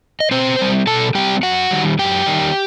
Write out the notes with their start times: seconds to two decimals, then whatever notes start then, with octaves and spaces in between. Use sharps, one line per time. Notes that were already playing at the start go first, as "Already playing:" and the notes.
0.20 D#5
0.31 B2 C4 C5
0.59 G3 C4
0.87 B2 A4 A5
1.15 G3 C4 G4 G5
1.43 F#2 F#4 F#5
1.71 D#3 G3
1.99 F#2 G4 G5
2.26 D#3 G3